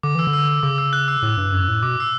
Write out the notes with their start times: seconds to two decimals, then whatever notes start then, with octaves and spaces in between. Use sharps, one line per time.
0.03 D3 D6
0.15 E3 E6
0.27 D3
0.33 E6
0.48 E6
0.63 C#3 D6
0.78 E6
0.93 F#6
1.08 E6
1.23 A2
1.37 G2
1.52 F#2
1.68 A2
1.82 B2 D6
2.00 E6